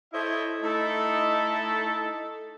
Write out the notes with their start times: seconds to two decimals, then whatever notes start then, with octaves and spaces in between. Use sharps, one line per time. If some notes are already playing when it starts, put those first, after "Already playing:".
0.14 E4 A4 C5 C#5 D#5 E5
0.63 A3 D#4 E4 A4